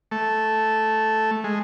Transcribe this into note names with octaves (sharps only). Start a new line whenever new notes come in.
A3
G#3